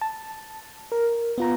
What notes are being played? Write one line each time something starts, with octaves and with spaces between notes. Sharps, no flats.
A5
A#4
B3 F4 A#5